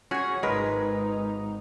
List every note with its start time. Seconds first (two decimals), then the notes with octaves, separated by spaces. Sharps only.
0.11 C#4 F#4 G#4 C#5
0.43 G#1 G#3 D#4 A#4 B4